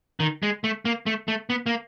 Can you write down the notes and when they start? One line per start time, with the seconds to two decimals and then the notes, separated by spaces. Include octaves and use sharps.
0.20 D#3
0.43 G#3
0.64 A3
0.85 A#3
1.06 A3
1.28 A3
1.50 B3
1.66 A#3